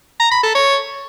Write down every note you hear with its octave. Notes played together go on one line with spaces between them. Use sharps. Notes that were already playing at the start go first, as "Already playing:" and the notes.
A#5
B5
A4
C#5